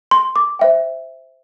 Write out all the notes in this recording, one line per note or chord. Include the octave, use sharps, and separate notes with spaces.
C6
D6
C5 E5 G5